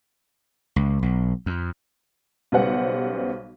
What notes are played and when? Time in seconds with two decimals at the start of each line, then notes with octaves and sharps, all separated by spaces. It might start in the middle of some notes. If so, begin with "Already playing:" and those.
0.76 C#2
1.02 B1
1.46 F2
2.52 B1 C#3 G3 B3 C5 F#5